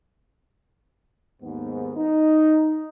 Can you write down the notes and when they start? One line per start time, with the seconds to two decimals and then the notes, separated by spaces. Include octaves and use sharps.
1.42 D#2 G#2 B3
1.96 D#4